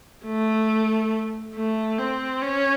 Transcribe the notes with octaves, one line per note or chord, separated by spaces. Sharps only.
A3
A3
C4
C#4